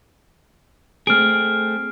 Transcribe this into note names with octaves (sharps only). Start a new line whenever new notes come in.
A3 C4 G#4 F6 D7